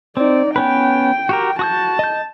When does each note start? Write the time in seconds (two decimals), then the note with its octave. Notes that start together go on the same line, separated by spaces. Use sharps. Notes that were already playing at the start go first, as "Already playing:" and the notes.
0.17 C4 D#4 D5
0.56 B3 C#4 B4 G5
1.29 F#4 G4 A#4
1.59 F#4 A5 D#6 G6
1.99 D#5 G6